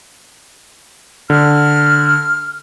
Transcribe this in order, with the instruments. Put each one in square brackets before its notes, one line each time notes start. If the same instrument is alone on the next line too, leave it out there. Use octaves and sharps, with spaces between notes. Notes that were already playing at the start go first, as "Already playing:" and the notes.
[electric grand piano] D3 [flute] F6